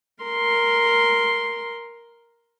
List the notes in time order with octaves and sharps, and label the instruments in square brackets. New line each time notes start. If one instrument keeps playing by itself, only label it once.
[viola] A#4 C6